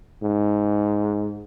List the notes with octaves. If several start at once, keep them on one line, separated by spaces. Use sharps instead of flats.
G#2